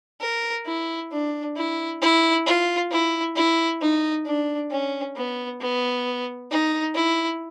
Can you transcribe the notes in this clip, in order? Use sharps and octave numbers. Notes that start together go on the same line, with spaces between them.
A#4
E4
D4
E4
E4
F4
E4
E4
D#4
D4
C#4
B3
B3
D#4
E4